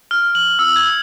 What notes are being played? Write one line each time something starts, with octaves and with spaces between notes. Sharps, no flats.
F6
F#7
E6
G#6